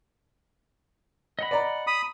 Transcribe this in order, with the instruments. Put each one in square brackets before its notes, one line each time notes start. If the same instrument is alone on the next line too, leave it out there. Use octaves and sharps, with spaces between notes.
[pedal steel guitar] D#5 F#5 B5
[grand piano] D5 A#5
[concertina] B5 D#6